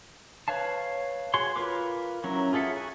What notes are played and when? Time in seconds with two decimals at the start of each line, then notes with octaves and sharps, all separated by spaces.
0.48 B4 C#5 F5 A5
1.34 F#4 G#4 C#5 C6
1.56 F4 A#4 B4 D6
2.24 F#3 C#4 E4 A#4
2.53 F4 G#4 A4 E5 F#5
2.76 F#4 G#5